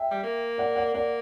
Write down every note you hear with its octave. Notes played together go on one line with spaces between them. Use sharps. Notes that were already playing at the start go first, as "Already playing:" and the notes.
Already playing: E5 G5
G3
A#3
D5 F#5
D5 F#5
A#3 D5 F#5